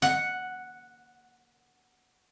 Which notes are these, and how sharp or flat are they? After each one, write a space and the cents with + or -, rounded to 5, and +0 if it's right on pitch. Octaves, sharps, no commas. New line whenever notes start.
F#5 +0